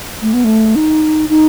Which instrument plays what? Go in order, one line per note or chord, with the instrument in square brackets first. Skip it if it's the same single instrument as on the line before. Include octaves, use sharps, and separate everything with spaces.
[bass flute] A3
B3
A3
D#4
D#4